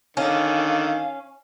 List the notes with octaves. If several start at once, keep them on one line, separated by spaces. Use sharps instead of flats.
D3 D#3 C#4 F5